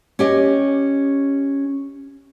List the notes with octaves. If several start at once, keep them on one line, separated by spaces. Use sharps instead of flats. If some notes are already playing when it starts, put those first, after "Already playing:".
C#4 G4 D#5